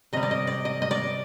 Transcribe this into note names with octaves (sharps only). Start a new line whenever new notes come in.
C3 G3 D#5
D5
D#5
D5
D#5
D#5
D5